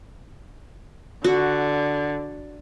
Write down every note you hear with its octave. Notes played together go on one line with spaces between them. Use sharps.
D3 F#4